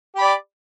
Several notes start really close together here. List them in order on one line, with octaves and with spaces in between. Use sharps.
G4 B5 D5